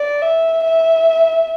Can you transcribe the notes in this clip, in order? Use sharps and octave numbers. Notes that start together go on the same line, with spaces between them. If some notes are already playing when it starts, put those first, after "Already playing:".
Already playing: D5
E5
E5